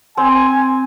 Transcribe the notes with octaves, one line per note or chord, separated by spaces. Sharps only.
C4 G#5